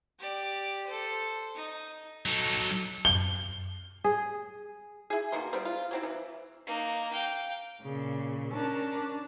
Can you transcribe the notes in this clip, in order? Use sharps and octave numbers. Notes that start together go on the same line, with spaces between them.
G4 D5
A4 C5
D#4
F#3 D#4 A4
F#2 G7
G#4
E4 G#4
B2 D#3 A#3 C6
G3 B3 C4
F4
F#3 C4 E4
E3
A#3 D#4
F5 G5
A#2 C#3
C#4 D4 A#4 A5